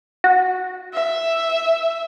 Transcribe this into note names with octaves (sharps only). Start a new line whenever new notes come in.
F#4
E5